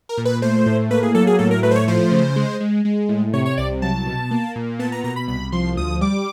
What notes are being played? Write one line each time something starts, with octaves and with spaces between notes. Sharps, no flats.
A#4
A#2
B4
A3 C5
A2
A#3 B4
G#4
F#3 A4
G#4
A2 A4
A#4
A3 B4
C5
C#5
F3 C5
C#3
G#3
G#3
G#3
A2
C3 C#5
C#5
C2 D5
F#3 A5
B2
A#3
A#2
B3 A5
A#5
B2 A#5
B5
C2 B5
F3 C6
D2 D#6
G3 D6